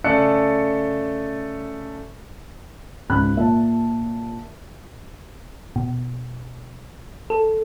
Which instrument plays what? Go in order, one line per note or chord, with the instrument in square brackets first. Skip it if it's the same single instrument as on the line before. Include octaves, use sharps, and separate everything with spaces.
[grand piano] C#3 A3 A4 D5 F#6 C#7
[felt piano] C#2 G#2 B5 F#6
A#2 E5 A5
[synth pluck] B2
A4